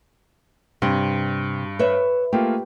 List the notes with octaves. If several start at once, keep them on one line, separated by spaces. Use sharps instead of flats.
G2 C3
B4 C#5 E5
A3 A#3 F4 G4